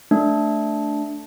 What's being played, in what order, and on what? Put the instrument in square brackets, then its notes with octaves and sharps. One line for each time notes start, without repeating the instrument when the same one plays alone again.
[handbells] A3 D4